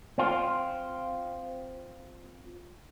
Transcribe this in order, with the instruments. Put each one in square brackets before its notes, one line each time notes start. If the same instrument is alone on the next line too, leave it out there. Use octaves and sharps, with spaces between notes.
[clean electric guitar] C4 F4